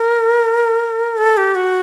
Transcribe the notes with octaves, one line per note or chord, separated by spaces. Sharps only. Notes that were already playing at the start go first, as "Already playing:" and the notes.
Already playing: A#4
A4
G4
F#4